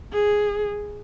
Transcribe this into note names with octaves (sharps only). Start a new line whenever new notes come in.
G#4